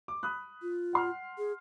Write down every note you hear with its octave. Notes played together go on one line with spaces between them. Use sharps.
D6
B5 D#6 F#6
F4
F#5 C6 F6
G#4